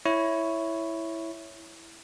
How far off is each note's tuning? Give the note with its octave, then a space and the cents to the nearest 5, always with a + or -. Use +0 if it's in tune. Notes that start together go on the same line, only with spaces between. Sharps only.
E4 +0 C#5 +0